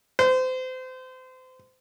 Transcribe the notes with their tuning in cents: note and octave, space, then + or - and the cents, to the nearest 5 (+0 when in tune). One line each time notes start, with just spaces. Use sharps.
C5 -30